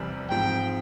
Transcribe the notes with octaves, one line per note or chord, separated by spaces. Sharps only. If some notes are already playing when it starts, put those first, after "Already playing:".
Already playing: F1 E2 C3 G3 C4
G#2 F3 C4 G5